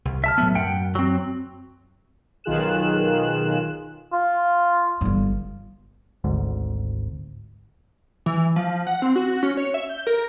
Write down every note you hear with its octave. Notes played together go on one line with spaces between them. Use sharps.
C2
E5 A5 F6
A2 F#3 B3
F#2 F#5 G5
F#3 C4
B1 D#3 F4 G#4 F#6 E7
F4
G1 G2
G#1 D2 G#2
E3
F3
F#5
C4
F#4
C#4
C#5
E5
G6
A#4